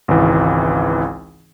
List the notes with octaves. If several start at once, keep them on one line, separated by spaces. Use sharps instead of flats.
G#1 C#2 E3